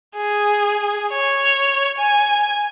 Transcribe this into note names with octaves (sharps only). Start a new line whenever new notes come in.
G#4
C#5
G#5